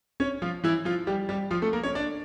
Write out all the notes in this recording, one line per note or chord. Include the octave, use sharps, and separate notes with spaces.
C#4 C#5
F3 F4
E3 E4
F3 F4
G3 G4
G3 G4
F3 F4
A3 A4
A#3 A#4
C#4 C#5
D4 D5